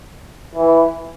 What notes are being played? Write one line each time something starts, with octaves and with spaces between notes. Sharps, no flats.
E3